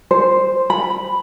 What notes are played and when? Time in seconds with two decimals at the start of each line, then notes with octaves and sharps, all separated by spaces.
0.11 C5
0.70 B5